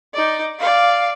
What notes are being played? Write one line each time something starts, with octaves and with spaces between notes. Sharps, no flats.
D#4 D5
D5 F5